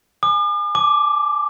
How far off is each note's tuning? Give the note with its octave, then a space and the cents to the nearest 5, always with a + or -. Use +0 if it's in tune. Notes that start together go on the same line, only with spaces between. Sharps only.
G#5 +0 D6 +45
A5 -30 D6 +0